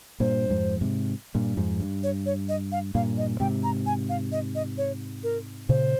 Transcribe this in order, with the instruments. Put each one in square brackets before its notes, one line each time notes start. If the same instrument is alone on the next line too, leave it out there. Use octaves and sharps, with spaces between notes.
[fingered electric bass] G2 A#2 [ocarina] C5
[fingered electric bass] F2 G#2
G#2 C3
G2 A#2
F2 G#2
G2
[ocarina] C#5
C#5
D#5
F5
[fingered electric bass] G2 A#2 [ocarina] F5
[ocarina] D#5
[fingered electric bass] G#2 C3 [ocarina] G5
[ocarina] A#5
G#5
F5
D#5
D#5
C#5
A#4
[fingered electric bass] A#2 C#3 [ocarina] C5